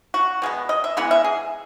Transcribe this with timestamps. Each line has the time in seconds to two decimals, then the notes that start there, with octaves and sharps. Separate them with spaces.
0.14 F#4
0.42 B2 G#3 B3
0.69 D#5
0.84 E5
0.97 E3 G#3 B3 F#5
1.11 E5
1.24 G#4